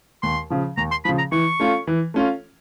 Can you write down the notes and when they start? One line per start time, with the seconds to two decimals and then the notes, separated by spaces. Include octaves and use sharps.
0.23 D#2 C6
0.50 C#3 F3
0.77 D#2 A#5
0.91 C6
1.05 C#3 F3 B5
1.18 A#5
1.32 E3 C#6
1.60 A3 C#4 F4
1.87 E3
2.14 A3 C#4 F4